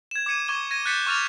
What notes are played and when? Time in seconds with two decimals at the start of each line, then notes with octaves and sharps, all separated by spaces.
0.11 G#6 E7
0.26 D6 G#6 C#7 D#7 E7
0.48 C#6 D6 G#6 G7
0.71 G#6 A#6 D#7
0.86 F#6 G6 A6 B6 C#7 E7
1.06 C#6 D6 F6 A6 F7